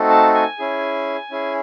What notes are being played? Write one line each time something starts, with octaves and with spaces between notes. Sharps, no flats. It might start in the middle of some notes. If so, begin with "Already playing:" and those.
Already playing: A3 C4 D#4 F#4 A4
A5
G#5
C#4 E4 G#4
C#4 E4 G#4